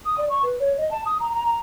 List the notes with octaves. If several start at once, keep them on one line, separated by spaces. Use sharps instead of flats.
D#6
D5
C#6
B4
C#5
D#5
A5
D#6
A#5
A#5
A#5